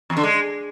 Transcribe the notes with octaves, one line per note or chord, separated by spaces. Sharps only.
E2
D3
G#3